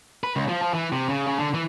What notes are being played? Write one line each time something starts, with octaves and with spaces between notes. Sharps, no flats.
B4
C#2
F3
F3
E3
C3
C#3
C#3
D3
E3